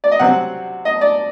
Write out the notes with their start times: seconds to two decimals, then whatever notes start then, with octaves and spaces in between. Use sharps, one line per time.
0.04 D5
0.11 D#5
0.19 C3 F#3 C4 F#5
0.85 D#5
1.01 D5